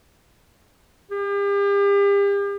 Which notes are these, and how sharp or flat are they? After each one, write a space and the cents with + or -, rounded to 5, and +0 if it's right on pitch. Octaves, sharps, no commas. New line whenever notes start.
G4 +40